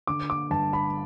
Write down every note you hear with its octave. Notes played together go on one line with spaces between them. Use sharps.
D3 D6
D6
G1 A5
B5